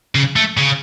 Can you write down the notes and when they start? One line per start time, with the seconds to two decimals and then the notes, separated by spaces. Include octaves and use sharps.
0.15 C#3
0.36 A3
0.57 C#3